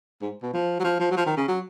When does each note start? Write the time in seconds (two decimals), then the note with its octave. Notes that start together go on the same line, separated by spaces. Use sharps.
0.22 G#2
0.42 B2
0.54 F3
0.80 F#3
0.84 F3
1.00 F3
1.11 F#3
1.17 F3
1.26 D#3
1.37 C#3
1.48 F#3